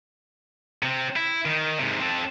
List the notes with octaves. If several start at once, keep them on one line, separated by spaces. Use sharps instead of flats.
C3 C4
E4
D#3
G#2 C3
C4 A4